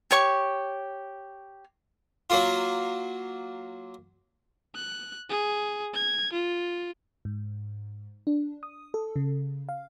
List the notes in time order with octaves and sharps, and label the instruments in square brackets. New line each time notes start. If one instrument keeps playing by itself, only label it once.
[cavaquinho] G4 C#5 C#6
[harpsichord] F#3 A#3 F4
[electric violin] F#6
G#4
G#6
F4
[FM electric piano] G#2
D4
D#6
A4
C#3
F5